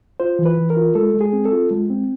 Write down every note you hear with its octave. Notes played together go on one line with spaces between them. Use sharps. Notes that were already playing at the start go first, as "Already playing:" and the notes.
F4 C5
E3
B4
E3
A#4
F4
G#3 A4
G#3
G#4
C4
A4
F4
G#3
C4